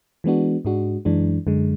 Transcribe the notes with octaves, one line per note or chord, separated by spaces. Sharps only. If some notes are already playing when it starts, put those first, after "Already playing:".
E3 G#3 B3 D4 F#4
G#2 G#3 D4 F#4
F#2 E3 G#3 D4
F#2 D3 G#3